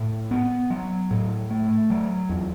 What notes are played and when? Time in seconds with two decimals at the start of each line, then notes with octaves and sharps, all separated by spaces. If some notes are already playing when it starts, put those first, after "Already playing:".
Already playing: A2
0.31 B3
0.70 F#3
1.11 A2
1.51 A3
1.90 F#3
2.29 E2